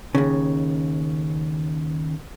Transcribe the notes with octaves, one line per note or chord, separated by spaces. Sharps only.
D#2 C#3